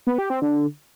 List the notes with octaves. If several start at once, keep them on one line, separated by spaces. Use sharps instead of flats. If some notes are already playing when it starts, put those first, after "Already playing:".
B3
G4
C4
D3